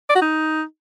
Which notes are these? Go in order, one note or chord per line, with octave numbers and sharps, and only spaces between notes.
D5
F#4
D#4